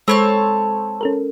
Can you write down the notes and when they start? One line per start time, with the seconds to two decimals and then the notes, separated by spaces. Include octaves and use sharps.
0.08 G#3 C4 A4 C#5 A5 B5
1.01 C#4 A4 A#4